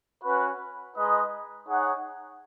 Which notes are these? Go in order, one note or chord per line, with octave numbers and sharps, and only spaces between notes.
C#4 F#4 B4
G#3 D#4 B4 D#5
D#4 G#4 C#5 F#5